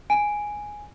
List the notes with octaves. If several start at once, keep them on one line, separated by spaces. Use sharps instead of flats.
G#5 D7